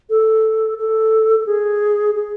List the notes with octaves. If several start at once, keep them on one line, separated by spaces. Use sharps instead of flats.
A4
A4
A4
G#4
G#4